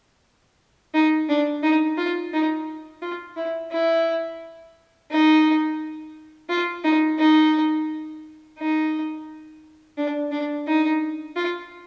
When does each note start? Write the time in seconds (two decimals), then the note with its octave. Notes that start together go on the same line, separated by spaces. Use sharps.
0.94 D#4
1.29 D4
1.63 D#4
1.97 F4
2.33 D#4
3.02 F4
3.36 E4
3.71 E4
5.11 D#4
6.49 F4
6.84 D#4
7.19 D#4
8.59 D#4
9.98 D4
10.32 D4
10.67 D#4
11.36 F4